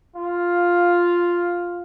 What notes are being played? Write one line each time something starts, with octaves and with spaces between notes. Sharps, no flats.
F4